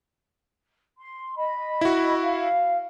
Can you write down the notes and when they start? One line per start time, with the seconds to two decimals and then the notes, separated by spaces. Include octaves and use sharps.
0.99 C6
1.36 D#5 B5
1.81 E4 F#4
2.20 F5